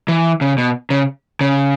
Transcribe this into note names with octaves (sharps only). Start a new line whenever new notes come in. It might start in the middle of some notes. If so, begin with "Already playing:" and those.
E3
C#3
B2
C#3
C#3